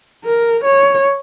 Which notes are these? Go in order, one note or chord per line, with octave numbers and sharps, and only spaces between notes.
A#4
C#5